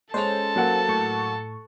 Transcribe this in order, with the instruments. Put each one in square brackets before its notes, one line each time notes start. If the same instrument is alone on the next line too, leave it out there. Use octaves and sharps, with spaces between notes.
[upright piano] G#3 F7 [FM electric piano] C#4 C5 [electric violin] A4 A5
[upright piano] F#3 A#3 F#5
[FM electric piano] A2 C#6